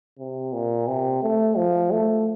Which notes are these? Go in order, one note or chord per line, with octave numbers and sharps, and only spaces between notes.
C3
A#2
C3
A3
F3
A3